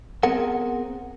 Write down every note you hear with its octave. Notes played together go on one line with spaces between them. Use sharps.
B3 C4 G#4 A#4 F#5